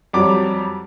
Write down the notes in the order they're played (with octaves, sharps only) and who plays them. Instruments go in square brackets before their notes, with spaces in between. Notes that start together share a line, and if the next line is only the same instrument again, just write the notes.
[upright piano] F2 F#3 G3 D6